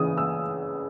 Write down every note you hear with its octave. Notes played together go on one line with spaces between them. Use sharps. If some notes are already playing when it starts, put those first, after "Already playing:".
Already playing: C#3 E3 D#6
E6